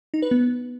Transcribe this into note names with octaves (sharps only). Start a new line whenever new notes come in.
D#4
B4
B3